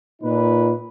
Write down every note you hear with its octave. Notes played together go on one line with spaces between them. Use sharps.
A#2 D#4 B4